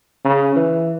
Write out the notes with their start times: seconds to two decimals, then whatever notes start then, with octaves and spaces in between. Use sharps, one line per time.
0.24 C#3
0.56 E3